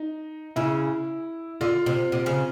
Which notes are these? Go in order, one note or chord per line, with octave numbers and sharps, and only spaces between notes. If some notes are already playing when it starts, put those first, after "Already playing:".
Already playing: D#4
C#3 E4
D3 F4
C3
C3
C#3